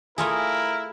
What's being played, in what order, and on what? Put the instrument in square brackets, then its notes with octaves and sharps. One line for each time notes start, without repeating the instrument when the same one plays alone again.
[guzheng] A3 F4 G#4 [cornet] E4 [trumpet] A#4